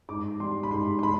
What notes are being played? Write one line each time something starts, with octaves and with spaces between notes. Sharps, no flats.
G#2 D6
G3 C6
B5
G#2 C6
C6
G#3 B5